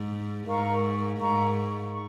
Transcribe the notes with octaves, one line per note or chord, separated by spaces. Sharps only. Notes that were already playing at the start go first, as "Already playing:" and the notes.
Already playing: G#2
G#2 A#4 F5 A#5 C#6
G#2 A#4 F5 A#5 C#6
C#6